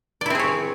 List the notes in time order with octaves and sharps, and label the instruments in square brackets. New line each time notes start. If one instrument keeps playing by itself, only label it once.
[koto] D5
E4
C4
G#4
C#5